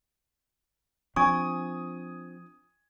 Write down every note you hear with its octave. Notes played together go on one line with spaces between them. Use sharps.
F3 C4 D4 G#5 C#6 D#6 G#6 D#7